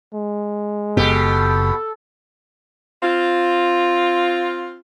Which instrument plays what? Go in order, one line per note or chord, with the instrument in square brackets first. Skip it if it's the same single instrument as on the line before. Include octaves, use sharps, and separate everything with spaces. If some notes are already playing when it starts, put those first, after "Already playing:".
[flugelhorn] G#3
[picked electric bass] F#1 B3 [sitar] B2 G4 [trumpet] A4
[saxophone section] C4 F4